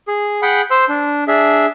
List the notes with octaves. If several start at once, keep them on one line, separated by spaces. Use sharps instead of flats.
G#4
G#4 F#5 G5 B5
C5 C6 E6
D4
D4 G#4 E5